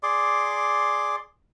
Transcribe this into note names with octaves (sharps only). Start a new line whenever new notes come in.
G#4 D5 C6 D6